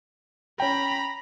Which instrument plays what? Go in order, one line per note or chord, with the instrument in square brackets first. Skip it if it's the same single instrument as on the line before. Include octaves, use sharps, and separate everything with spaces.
[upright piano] C#4 G5 [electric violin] A#5 B5